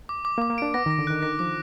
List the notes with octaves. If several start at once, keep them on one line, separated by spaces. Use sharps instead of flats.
D6
D6
A#3
D6
A#3
D4 D7
B3 A#6
D#3
A#6
D3
D#3 F#6
D#3 A#6
F3 D6